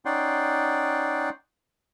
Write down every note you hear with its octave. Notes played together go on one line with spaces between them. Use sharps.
C#4 D#4 D5 F#5 G5 C6